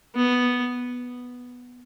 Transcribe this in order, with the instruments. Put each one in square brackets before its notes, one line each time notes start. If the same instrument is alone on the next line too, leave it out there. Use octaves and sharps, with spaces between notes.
[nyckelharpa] B3